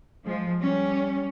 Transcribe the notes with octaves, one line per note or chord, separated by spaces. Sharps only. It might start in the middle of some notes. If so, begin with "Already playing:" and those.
F3 G#3
G3 C#4